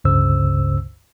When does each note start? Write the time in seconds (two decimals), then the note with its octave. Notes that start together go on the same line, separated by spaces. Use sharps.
0.04 G1 C#2 G2 C#3 C5 E6